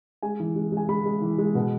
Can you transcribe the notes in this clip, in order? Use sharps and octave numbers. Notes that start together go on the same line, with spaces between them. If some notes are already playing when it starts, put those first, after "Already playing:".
G#3 G#5
E3
G#3
G#3 G#5
G#3 B5
G#3
E3
G#3
B2